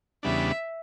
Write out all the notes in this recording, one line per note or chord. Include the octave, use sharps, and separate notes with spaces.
E2 C#3 G3 B3 D4 E5